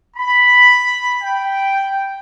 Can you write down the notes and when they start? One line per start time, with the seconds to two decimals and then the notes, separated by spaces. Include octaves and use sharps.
0.16 B5
1.22 G5